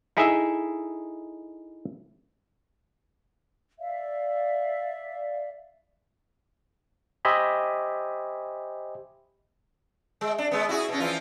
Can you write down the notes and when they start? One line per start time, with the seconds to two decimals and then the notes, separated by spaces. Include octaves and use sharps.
0.17 D#4 E4 G#4 A4 D#5 E5
3.79 D5 E5 F5
7.25 G4 C5 D#5 E5 G#5 B5
10.21 G#3
10.38 D4
10.51 G#3 B3
10.69 E4 F#4 G#4
10.89 B2 C#4
11.00 E3 F3 F4